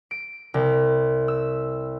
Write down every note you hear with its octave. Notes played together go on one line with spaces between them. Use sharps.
D7
C2
E6